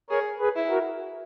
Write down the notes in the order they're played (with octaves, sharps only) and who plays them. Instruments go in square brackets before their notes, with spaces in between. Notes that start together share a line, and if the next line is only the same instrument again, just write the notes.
[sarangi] G#4 [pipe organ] A#4 C#5
[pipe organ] G#4 B4
[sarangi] E4
[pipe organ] F#4 A#4